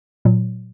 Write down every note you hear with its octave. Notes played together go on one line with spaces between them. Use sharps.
A#2 F#3